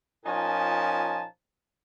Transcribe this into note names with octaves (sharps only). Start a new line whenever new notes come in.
A#2 F3 C#4 D#4 G#5 A5